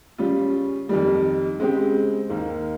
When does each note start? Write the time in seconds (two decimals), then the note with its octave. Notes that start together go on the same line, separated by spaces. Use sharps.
0.18 C#3 G3 C#4 F4
0.89 F2 D#3 G3
1.59 C#3 G#3 C4 G4
2.29 D#2 D#3 A#3